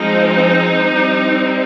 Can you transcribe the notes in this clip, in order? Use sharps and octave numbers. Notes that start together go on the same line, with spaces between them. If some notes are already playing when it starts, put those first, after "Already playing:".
Already playing: F3 G#3 C4 D#4
G3 C4